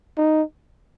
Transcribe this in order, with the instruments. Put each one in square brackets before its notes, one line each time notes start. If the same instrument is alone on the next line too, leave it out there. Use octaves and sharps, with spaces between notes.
[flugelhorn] D#4